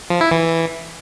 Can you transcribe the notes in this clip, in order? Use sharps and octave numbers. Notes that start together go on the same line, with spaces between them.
F3
E4
E3